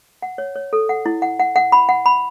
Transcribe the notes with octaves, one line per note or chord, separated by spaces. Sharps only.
F#5
C#5
C#5
A4
F#5
E4
F#5
F#5
F#5
B5
F#5
B5